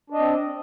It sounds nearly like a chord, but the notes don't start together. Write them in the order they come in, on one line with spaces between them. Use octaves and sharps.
D4 D#5 C4